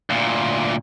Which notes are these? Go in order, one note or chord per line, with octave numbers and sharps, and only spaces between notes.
D2 A#2